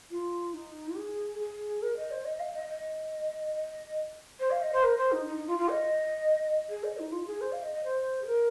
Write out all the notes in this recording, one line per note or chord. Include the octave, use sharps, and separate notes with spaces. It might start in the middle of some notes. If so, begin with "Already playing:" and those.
F4
D#4
G#4
G#4
A#4
D#5
C5
D#5
F5
D#5
D#5
D#5
C5
F5
D#5
C5
A#4
C5
D#4
D#4
D#4
F4
F4
D#5
G#4
D#5
D#4
F4
G#4
C5
F5
D#5
D#5
C5
G#4
A#4